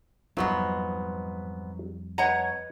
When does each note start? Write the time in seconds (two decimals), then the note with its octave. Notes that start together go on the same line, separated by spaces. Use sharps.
0.37 F2 G#2 F#3 G3 B3 D#4 F4 C5
2.18 B4 C#5 D#5 F#5 A#5